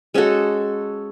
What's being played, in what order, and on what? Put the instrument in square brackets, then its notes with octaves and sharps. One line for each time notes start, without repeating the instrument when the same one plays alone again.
[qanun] G#3 C#4 F#4 A4